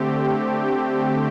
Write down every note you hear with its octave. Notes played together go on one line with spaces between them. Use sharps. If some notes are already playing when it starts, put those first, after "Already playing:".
Already playing: D3 A3 C4 G4